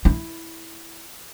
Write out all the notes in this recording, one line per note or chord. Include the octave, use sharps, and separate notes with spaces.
E4